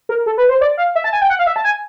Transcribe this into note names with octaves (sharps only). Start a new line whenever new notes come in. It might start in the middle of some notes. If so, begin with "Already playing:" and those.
A#4
A4
B4
C5
D5
F5
E5
A5
G#5
G5
F#5
F5
E5
A5
G#5